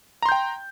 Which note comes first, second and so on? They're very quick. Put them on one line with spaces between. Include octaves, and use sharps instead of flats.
A#5 C6 G6 G5